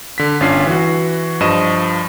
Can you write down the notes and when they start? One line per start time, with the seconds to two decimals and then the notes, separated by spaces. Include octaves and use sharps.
0.18 D3 B6
0.40 G1 C#4 D4 F4 C7
0.67 E3 F#4
1.41 G2 F3 D#5 D#7 E7